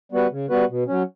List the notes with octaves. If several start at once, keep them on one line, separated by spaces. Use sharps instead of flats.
G3 B3 F#4 B4
C#3
G3 B3 F#4 B4
B2
F#3 C#4